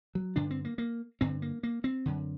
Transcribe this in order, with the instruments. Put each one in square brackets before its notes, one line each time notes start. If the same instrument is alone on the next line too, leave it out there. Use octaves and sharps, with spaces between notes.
[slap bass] F#3
G2 D3 D4
C4
A#3
A#3
G2 D3 C4
A#3
A#3
C4
F#2 D3